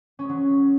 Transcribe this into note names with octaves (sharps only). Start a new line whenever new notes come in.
C#4
G#3
F#3